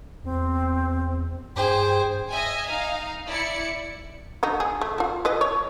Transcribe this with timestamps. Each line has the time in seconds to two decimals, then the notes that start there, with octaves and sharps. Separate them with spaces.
0.24 E2 C4
1.56 G2 G#4 C5 G5
2.30 D#5 E5 G#5
2.66 D#4 F5
3.28 E4 D5 C#7
4.43 D3 D#4 F#4
4.60 G#4
4.81 A3
4.98 F4 F#4
5.25 E3 B4 D#5
5.41 C#5